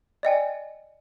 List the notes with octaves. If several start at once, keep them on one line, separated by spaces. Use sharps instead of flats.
D5 D#5 G5 G#5